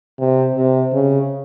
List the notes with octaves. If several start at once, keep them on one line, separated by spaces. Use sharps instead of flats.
C3
C3
C#3